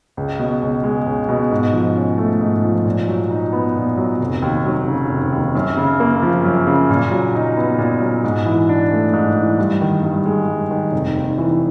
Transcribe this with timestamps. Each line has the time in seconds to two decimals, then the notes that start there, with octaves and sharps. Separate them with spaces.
0.17 C#2
0.39 B2
0.62 C#2
0.83 G#3
1.06 C#2
1.29 B2
1.51 G#2
1.73 F3
1.96 C#4
2.18 A3
2.41 G#2
2.64 F3
2.85 A#2
3.08 F#3
3.31 D#4
3.52 B3
3.76 A#2
3.97 F#3
4.21 F1
4.42 D#2
4.65 F#3
4.88 C#3
5.09 F1
5.32 D#2
5.55 F#2
5.77 C#3
6.00 A#3
6.23 F3
6.44 F#2
6.67 C#3
6.90 A#2
7.11 F#3
7.35 D#4
7.57 B3
7.78 A#2
8.02 F#3
8.24 G#2
8.46 E3
8.69 D4
8.92 A3
9.13 G#2
9.35 E3
9.59 G2
9.81 D#3
10.03 G2
10.26 G#3
10.48 G2
10.71 D#3
10.92 F1
11.16 D#2
11.38 E3